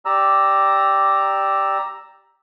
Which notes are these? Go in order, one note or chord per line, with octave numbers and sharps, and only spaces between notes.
G4 D5 A#5 E6